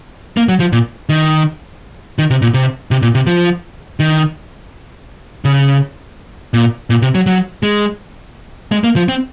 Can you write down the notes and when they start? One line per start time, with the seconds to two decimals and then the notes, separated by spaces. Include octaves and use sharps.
0.37 A#3
0.48 F#3
0.60 F3
0.72 A#2
1.09 D#3
2.19 D#3
2.30 C3
2.42 A#2
2.54 C3
2.91 C3
3.02 A#2
3.15 C3
3.27 F3
4.00 D#3
5.45 C#3
6.54 A#2
6.90 A#2
7.02 C3
7.15 F#3
7.26 F#3
7.63 G#3
8.72 G#3
8.84 A#3
8.96 F3
9.09 C4